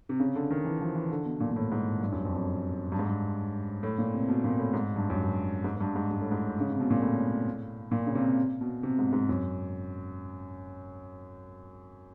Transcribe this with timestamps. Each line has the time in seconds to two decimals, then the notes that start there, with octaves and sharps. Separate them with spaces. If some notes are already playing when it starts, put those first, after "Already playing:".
0.09 C3
0.20 C#3
0.35 D3
0.51 D#3
0.65 E3
0.81 F3
0.95 E3
1.11 D3
1.25 B2
1.40 A#2
1.51 A#2
1.56 A2
1.72 G#2
2.01 G2
2.12 F#2
2.25 F2
2.36 F#2
2.92 G2
2.99 G#2
3.06 G2
3.83 A2
3.98 A#2
4.14 C3
4.28 B2
4.44 A#2
4.59 A2
4.73 G#2
4.96 G2
5.10 F#2
5.23 G2
5.64 G#2
5.77 G#2
5.81 G2
5.96 G#2
6.11 G#2
6.21 A2
6.32 G#2
6.60 C#3
6.70 C3
6.80 B2
6.90 A#2
7.02 A2
7.91 A#2
8.06 C#3
8.15 C3
8.61 B2
8.83 C3
8.99 G#2
9.13 G#2
9.29 F#2